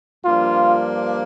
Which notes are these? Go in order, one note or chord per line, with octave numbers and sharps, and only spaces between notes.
G2 F3 A#3 D4 F4